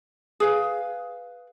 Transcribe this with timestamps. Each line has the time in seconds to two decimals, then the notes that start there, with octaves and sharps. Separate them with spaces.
0.40 G#4 B4 F5